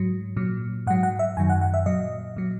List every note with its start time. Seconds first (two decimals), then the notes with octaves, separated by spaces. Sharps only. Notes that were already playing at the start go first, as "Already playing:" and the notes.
Already playing: G#2 F#3
0.36 A#2 F#3
0.87 G#2 F#5
0.90 F#3
1.03 F#5
1.19 E5
1.37 F#2 D#3 F#3 G#5
1.50 F#5
1.61 F#5
1.74 E5
1.86 A#2 F#3 D#5
2.37 A#2 F#3